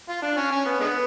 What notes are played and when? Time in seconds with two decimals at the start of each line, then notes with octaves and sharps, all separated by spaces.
0.09 F4
0.22 D4
0.37 C#4
0.51 C#4
0.65 B3
0.80 D3 G#3 B3